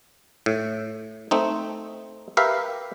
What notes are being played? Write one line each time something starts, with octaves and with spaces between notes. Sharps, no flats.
A2
A3 C4 D#4
G4 A#4 B4 E5 F5